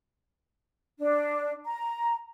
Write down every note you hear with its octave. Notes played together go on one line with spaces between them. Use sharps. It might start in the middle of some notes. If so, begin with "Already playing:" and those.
D4
A#5